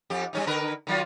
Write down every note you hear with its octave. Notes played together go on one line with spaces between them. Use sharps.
F2 G4
G3 C#4 D#4
D3 A#4 B4
D#3 F#3 F4